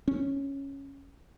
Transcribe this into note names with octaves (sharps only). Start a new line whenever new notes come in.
C#4